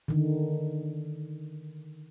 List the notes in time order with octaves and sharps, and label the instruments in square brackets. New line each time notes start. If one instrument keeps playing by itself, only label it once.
[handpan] D3 D#3